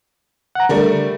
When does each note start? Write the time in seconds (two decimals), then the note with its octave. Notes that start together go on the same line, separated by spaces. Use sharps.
0.55 F#5 A#5
0.69 D3 G3 A3 A#4